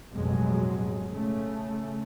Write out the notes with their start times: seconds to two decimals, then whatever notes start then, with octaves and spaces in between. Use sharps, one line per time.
0.10 A1 F2 B2 F#3 G#3
1.09 C#3 A3